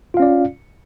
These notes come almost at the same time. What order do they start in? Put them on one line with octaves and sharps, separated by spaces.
F4 F5 C#4 D5